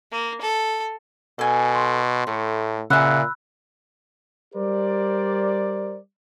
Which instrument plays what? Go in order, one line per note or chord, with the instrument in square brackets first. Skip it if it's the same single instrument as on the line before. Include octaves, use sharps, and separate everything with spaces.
[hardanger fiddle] A#3
A4
[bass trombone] B2 [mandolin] A4 G#5
[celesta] C6
[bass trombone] A2 [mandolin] A3
[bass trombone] A#2 [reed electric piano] C#3 E5 [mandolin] G#4 F#5 [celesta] B5 E6 F#6
[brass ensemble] G3 G4 A#4 C5 D5